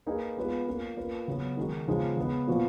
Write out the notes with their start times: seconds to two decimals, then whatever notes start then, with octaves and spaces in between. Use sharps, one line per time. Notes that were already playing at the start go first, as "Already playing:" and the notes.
0.06 A#3 D#4 G#4 B4
0.37 G#3 B3 F4 G#4 B4
0.67 A#3 C#4 F4
0.97 A#3 F4 B4
1.28 C#3 F#3 B3
1.57 D#3 G#3 D#4 F#4
1.88 C#3 F3 G#3 B3 D#4
2.17 C#3 G#3 B3
2.47 A#2 F3 B3 F#4